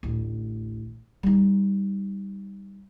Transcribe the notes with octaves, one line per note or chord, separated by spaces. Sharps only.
A1 D2
G3 D#4